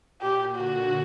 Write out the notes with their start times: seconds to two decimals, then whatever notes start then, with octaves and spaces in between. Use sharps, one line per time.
0.21 A#2 G4
0.56 D3 F#4